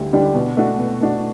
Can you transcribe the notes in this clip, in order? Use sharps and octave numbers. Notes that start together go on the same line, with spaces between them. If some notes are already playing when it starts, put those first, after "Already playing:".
Already playing: D2 D3 G3 G4
D3 G3 D4 G4
B2
A3 D4 F#4
B2
A3 D4 F#4